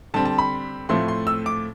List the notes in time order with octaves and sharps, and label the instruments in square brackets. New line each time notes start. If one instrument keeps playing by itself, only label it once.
[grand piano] D3 G3 C4 A5
A5
B5
A2 F3 A3 C4 C6
C6
E6
D6